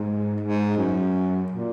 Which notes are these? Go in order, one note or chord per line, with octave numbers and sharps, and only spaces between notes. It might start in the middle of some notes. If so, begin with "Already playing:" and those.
Already playing: G#2
G#2
F#2
A#2